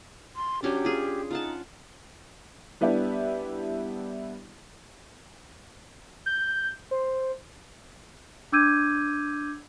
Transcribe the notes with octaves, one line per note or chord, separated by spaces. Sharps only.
C6
F#3 C#4 D4 G4
F4 G#4
D#4 F4 F#5 A5
G3 B3 D4 E4 G4
G6
C5
D4 D6 E6 G6 G#6 D#7